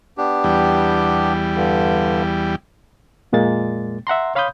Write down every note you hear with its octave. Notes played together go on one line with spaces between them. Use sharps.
B3 D4 G4
E2 G3
G2 D3
F2 A#2 G#3 A#3 A6
E5 F#5 A#5 C6
C#5 F5 B5 C6 D#6 G6